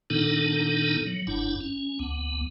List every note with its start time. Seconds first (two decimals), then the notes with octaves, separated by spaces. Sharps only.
0.10 A#2 D#3 B3 D4 D#4 A4
1.07 F#3
1.27 F#1 G2 D4 E4
1.61 C#4
1.99 D2 B3